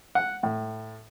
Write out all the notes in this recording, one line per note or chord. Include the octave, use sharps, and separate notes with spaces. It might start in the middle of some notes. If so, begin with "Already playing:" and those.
F#5
A2